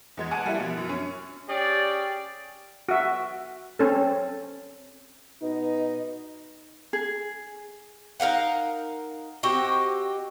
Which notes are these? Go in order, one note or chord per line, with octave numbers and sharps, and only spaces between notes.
E2 G#3 G#6
F#5 G#5 A5 F#6 C#7 D7
G3 A#3 E4
B2 F3
F#2
C#4
C#4 G4 G#4 C#5 D5
F#4 E5
C4 C#4 A4
B2 D#4 D#5
G#4
D#4 A#4 F5 F#5
C4 F#4 G4 D#5